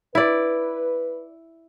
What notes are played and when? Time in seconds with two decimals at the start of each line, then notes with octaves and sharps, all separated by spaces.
0.15 E4 B4 D5